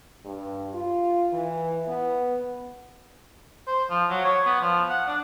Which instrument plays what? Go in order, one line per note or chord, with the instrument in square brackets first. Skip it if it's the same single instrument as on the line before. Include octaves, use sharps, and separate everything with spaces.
[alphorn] G2
F4
E3
B3
[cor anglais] C5
F3
F#3
C#5
B3
F3
F#5
D4